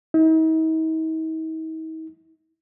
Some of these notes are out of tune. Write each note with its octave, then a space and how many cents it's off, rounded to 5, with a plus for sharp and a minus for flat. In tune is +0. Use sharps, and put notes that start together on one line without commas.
D#4 +45